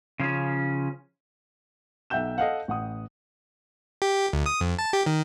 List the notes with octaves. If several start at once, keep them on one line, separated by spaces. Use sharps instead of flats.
C#3 F3 C#4
B1 E5 F#5 G5 G6 E7
A4 D#5 F5 F#5
A1 F#5 D#6
G4
D2
D#6
F2
A5
G4
D#3